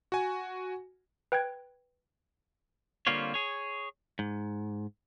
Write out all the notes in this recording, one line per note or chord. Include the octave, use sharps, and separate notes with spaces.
F#4 G#5
B4 G5 F#6 G#6
D3 G3 A#3 C4 F4 C#5
G#4 C#5
G#2